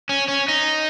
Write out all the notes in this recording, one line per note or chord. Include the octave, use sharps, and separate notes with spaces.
C#4
C#4
D#4